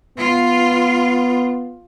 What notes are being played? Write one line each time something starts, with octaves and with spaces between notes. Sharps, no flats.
B3 F4